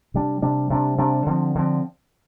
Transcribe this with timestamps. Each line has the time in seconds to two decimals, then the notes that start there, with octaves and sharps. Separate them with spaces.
0.14 C3 G3 D4
0.42 C3 G3 D4
0.70 C3 G3 D4
0.98 C3 G3 D4
1.26 D3 F3 C4
1.55 D3 F3 C4